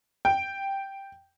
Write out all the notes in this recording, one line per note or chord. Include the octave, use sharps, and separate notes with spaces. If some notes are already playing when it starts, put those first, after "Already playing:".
G5